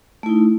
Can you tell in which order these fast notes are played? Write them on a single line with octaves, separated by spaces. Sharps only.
A3 E4 D#4